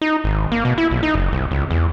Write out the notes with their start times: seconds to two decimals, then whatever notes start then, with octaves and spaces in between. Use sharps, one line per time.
0.01 D#4
0.24 G#1
0.52 A#3
0.65 B2
0.78 E4
0.91 B1
1.03 D#4
1.15 F#1
1.32 C2
1.51 C#2
1.71 E2